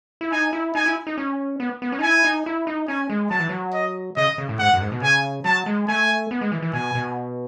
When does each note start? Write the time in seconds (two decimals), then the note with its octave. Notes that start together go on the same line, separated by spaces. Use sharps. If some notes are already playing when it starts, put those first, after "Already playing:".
0.21 E4
0.32 D#4 G#5
0.53 E4
0.75 D#4 G#5
0.86 E4
1.07 D#4
1.18 C#4
1.60 B3
1.82 B3
1.92 C#4
1.99 D#4
2.02 E4 G#5
2.25 D#4
2.46 E4
2.67 D#4
2.88 C#4 G#5
3.10 G#3
3.31 F#3 A5
3.40 E3
3.49 F#3
3.73 D#5
4.17 C#3 D#5
4.38 C#3
4.49 A2
4.59 G#2 F#5
4.74 F#2
4.81 G#2
4.92 B2
5.02 C#3 G#5
5.45 F#3 A5
5.66 G#3
5.88 A3 G#5
6.31 B3
6.41 G#3
6.52 E3
6.62 E3
6.73 B2 G#5
6.95 B2